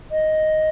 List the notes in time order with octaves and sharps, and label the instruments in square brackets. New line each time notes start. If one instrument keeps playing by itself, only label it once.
[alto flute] D#5